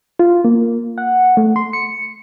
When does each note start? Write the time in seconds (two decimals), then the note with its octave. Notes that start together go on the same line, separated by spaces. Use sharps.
0.19 F4
0.45 A#3
0.98 F#5
1.37 A3
1.56 C6
1.73 C#7